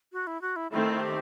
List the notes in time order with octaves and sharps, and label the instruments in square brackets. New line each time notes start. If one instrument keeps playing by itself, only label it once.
[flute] F#4
E4
F#4
E4
[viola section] D#3 A3 C4 [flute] E4
[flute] G4